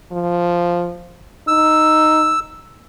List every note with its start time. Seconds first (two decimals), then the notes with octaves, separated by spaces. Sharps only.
0.12 F3
1.48 D#4 E6